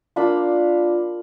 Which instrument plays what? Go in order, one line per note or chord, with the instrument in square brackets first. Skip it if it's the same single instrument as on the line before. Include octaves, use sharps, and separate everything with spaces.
[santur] A#3 D4 F4 B5